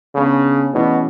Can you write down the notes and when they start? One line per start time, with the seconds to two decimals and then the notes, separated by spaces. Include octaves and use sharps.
0.14 C#3 B3 D4 G#4
0.73 B2 E3 A3 C#4 G#4 D5